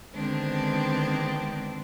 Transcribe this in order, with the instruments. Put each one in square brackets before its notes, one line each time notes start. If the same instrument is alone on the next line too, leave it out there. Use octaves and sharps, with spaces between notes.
[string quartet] D3 D#3 G#3 B3 C4 D4